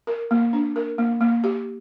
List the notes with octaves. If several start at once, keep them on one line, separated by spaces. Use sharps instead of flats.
A#4
A#3
D4
A#4
A#3
A#3
G4